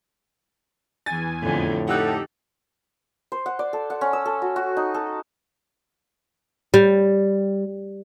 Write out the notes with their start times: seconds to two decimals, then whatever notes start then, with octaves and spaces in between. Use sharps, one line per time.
1.06 E2 G#5 A6
1.42 F2 A2 D3
1.87 D#4 G4 A4 F#5 E6 F#6
3.32 C5
3.46 F#5
3.59 D5
3.73 A4
3.90 F#5
4.01 C#4
4.13 E6
4.26 A4
4.42 F#4
4.56 F#4
4.77 D#4
4.94 A4
6.74 G3